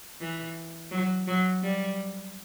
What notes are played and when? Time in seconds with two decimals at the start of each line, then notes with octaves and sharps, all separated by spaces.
0.21 E3
0.91 F#3
1.27 F#3
1.63 G3